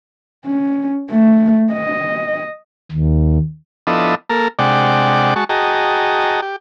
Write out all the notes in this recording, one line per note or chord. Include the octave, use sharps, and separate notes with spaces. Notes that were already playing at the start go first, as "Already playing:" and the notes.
C#4
A3
D#5
D#2
F3 B3 D4 E4 A4 D#5
A#3 A4 A#4
C3 G#3 D4 D5 F#5 G5
G#3 F#4 A5 C#6
F#4 G#4 D#5 G5 A5 A#5
G4